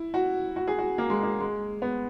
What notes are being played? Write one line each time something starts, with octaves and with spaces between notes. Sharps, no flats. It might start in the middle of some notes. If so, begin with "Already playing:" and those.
Already playing: E4
F#4
F#4
G#4
F#4
A#3
G#3
A#3
G#3
B3